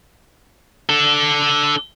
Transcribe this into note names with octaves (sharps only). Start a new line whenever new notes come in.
D4 A4